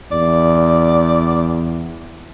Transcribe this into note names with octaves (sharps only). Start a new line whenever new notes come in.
E2 D5